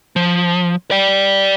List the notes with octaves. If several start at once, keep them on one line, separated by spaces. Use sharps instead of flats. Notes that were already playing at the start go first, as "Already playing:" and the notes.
F3
D5 G5